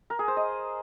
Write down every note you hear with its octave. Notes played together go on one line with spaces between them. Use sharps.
A#4
G#4
C5
D#5